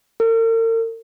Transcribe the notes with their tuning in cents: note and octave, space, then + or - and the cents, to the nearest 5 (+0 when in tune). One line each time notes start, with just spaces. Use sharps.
A#4 -45